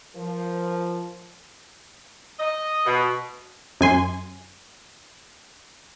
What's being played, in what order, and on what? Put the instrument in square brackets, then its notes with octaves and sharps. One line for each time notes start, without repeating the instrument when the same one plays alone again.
[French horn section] F3 [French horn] A#4
[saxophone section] D#5
B2
[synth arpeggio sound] F#2 G#5 C6